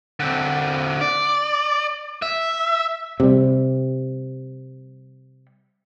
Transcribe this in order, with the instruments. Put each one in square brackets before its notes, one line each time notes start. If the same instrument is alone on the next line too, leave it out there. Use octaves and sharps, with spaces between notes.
[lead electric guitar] D3 C4
D5
E5
[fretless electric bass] C3 G3